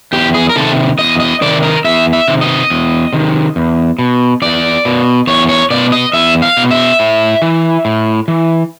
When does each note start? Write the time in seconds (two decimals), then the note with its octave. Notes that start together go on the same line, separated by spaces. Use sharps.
0.13 E2 G4
0.34 G#4
0.50 A#4
0.56 C3 D#3 A4
0.99 E2 D#5
1.20 D#5
1.41 C3 D#3 D5
1.63 A#4
1.85 E2 E5
2.13 E5
2.28 C3 D#3
2.41 D#5
2.70 E2
3.13 C3 D#3
3.56 E2
3.99 B2
4.42 E2 D5
4.85 B2
5.27 E2 C#5
5.49 C#5
5.70 B2 D5
5.92 D#5
6.13 E2 E5
6.42 F5
6.57 B2
6.71 E5
6.99 A2
7.42 E3
7.85 A2
8.28 E3